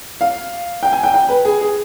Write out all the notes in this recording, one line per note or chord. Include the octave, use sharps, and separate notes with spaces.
F5
G5
G#5
G5
G5
B4
G#4
G#4